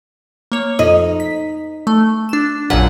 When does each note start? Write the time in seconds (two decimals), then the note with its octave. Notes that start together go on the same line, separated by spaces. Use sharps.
0.52 A#3 C#5
0.79 F2 D#4
1.20 B6
1.87 A3
2.29 D4 E7
2.70 A#1 F#2 A#2 F#5